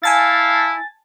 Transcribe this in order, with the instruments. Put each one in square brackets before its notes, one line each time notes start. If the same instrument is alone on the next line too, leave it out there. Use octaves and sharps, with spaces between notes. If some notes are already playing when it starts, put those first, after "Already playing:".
[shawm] E4 [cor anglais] F5 [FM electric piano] G#5 A5 A6